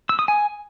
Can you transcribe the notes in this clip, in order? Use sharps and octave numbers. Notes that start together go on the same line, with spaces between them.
E6
D#6
G#5